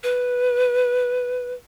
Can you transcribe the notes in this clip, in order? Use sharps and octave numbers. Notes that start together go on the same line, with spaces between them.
B4